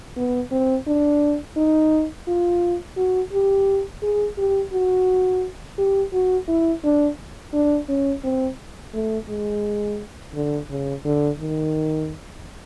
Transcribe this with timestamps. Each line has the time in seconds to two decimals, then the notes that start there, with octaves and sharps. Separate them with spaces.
0.17 B3
0.52 C4
0.88 D4
1.57 D#4
2.28 F4
2.97 F#4
3.33 G4
4.03 G#4
4.38 G4
4.73 F#4
5.79 G4
6.13 F#4
6.48 E4
6.84 D4
7.54 D4
7.89 C#4
8.24 C4
8.94 A3
9.29 G#3
10.35 D3
10.70 C#3
11.05 D3
11.40 D#3